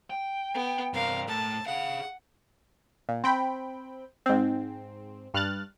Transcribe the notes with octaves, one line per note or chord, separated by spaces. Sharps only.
G5
B3
G2 C3 A#4 F5
A2 A5
G#4 F5 F#5
A#2
C4 G5 B5
G#2 C4
G2 F6 F#6 A6